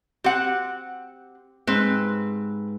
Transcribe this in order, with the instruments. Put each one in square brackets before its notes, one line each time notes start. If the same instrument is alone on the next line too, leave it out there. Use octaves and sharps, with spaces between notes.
[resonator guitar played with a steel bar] C4 F#5 [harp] G4
[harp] G#2 [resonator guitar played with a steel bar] C4 B4